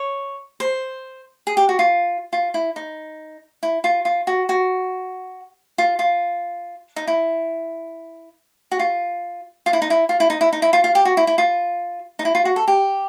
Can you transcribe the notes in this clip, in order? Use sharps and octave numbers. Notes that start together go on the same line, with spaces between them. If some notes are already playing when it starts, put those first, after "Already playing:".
Already playing: C#5
C5
G#4
G4
F#4
F4
F4
E4
D#4
E4
F4
F4
F#4
F#4
F4
F4
D#4
E4
F#4
F4
F4
E4
D#4
E4
F4
E4
D#4
E4
D#4
E4
F4
F4
G4
F#4
E4
E4
F4
D#4
E4
F4
F#4
A4
G4